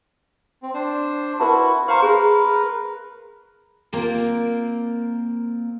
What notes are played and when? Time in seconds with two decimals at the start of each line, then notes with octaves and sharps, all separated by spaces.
0.63 C4
0.74 D4 C5
1.40 E4 F#4 A#4 B4 A5
1.88 C5 F5 A#5 C6 C#6
2.02 G#4 A#4 B4
3.93 A#3 C4 F4 A#4